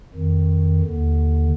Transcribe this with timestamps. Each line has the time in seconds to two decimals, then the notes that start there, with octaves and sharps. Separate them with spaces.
0.14 F2 D#3
0.81 D#2 D3